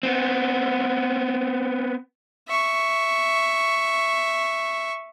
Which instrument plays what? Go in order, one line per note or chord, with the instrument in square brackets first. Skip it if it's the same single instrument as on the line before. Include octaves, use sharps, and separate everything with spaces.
[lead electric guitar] B3 C4
[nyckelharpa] E5 C#6